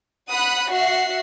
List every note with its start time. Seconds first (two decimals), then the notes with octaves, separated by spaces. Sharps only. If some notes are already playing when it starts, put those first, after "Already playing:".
0.29 F#5 B5 D#6 F#6
0.71 F#4 E5 F#5 C7